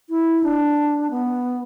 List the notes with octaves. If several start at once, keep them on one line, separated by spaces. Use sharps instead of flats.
E4
D4
B3